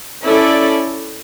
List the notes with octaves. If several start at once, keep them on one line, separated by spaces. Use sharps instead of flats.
C#4 E4 A4 D5